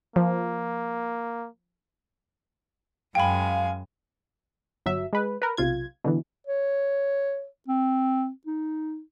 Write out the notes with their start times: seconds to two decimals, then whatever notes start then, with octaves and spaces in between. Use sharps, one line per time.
0.16 F3 A#3
3.15 F#2 G#3 F5 G5 G#5 B5
4.86 G1 F#3 E5
5.13 G#3 B4
5.42 A#4 B4
5.57 B1 C3 F4 G#6
6.04 B2 D3 E3
6.47 C#5
7.68 C4
8.47 D#4